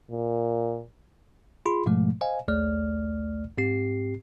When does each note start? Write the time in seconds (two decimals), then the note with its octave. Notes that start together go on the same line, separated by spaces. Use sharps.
0.10 A#2
1.66 F4 G#4 B5 C6
1.86 G#2 B2 F3 G#3 A3
2.21 C5 D#5 F5 G#5
2.48 A#1 D#2 A3 D5 F6
3.58 G#2 C4 G4 C7